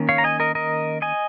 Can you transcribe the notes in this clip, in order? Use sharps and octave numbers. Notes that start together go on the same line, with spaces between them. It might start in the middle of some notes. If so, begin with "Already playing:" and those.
Already playing: D#3 A#3 C#4
C#5 F5
A#5
D#5 G#5
A#4 D#5
A#4 D#5
D#5 G#5